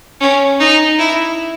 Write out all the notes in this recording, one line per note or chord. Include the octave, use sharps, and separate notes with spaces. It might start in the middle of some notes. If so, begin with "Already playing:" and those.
C#4
D#4
E4